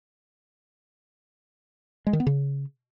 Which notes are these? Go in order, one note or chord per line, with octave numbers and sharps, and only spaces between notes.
G#3
D#3
B3
C#3